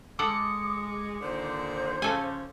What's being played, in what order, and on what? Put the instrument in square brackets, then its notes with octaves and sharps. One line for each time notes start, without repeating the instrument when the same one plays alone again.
[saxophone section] G#3 [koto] A4 F#5 [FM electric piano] D6 C#7 [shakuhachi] D#6
[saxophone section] A#2 D3 D#3 [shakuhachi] C5
[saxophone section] C#3 C#4 [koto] F3 A4 G#5